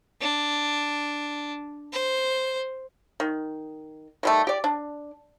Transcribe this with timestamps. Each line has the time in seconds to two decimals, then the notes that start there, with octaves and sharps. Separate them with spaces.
0.21 D4
1.93 C5
3.20 D#3
4.23 D#3 G3 A3
4.47 G4 D5
4.64 D4